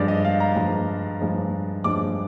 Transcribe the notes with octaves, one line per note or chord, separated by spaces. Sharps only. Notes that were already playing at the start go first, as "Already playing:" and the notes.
Already playing: G2 F3 G#3 D5
D#5
F5
A#5
G2 F3 G#3
G2 F3 G#3
G2 F3 G#3 D6